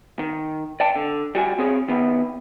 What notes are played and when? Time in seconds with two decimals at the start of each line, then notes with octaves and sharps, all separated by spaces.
0.19 D#3
0.80 D5 G5 A5
0.96 D3
1.35 G3 F#4 G#5
1.58 C4 G#4 C#5
1.88 D#3 B3